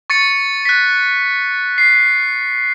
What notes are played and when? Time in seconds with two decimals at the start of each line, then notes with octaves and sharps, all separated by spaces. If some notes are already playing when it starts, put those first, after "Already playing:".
0.10 C#6 A6 C#7
0.65 F#6 B6
1.78 C7